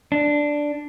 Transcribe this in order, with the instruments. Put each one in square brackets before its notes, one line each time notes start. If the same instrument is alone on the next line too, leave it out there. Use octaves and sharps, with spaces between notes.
[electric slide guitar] D4